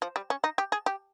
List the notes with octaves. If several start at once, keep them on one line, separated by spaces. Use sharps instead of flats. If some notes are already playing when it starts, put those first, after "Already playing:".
F3
G3
C#4
D#4
G4
G#4
G4